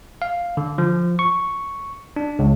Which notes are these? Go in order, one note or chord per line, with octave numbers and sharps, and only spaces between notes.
F5
D3
F3
C#6
D4
C#2